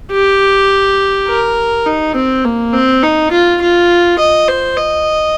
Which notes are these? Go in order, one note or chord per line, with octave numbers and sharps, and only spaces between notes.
G4
A#4
D#4
C4
A#3
C4
D#4
F4
F4
D#5
C5
D#5